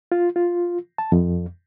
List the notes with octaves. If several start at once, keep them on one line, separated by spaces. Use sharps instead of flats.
F4
F4
A5
F2